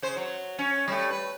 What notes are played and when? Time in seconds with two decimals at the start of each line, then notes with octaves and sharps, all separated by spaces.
0.02 C#3 C5
0.17 F#3
0.59 C#4
0.88 G3 A3
1.10 B4